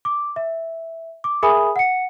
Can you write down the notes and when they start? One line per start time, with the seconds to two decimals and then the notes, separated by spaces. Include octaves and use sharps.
0.05 D6
0.36 E5
1.24 D6
1.43 G#4 A#4 E5 G#5 B5 D#6
1.76 F#5 C#7